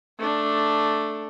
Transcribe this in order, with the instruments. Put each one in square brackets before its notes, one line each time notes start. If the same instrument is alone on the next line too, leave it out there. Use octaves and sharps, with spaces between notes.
[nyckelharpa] A3 D4